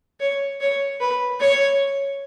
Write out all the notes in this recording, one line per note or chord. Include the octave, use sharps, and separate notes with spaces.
C#5
C#5
B4
C#5